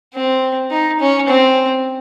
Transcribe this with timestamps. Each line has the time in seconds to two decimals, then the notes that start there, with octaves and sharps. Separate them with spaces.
0.14 C4
0.71 D#4
1.00 C#4
1.28 C4